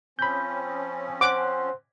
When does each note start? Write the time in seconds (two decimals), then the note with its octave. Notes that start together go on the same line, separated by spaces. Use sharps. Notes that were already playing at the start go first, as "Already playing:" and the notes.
0.19 F3 C4 C#4 B5 G6
1.21 C5 F#5 D6 F#6